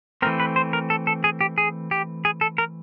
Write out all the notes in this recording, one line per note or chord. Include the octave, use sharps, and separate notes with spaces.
E3 A3 C4 A#4
B4
C5
A#4
A4
A4
G#4
G4
G#4
G4
G#4
A4
A#4